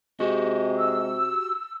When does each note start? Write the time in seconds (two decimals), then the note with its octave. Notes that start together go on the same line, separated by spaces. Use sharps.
0.20 C3 G#3 F#4 G4
0.78 E6